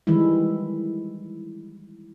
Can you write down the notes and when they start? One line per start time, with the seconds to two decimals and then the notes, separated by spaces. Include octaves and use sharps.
0.07 D#3 E3 G3 G#3 E4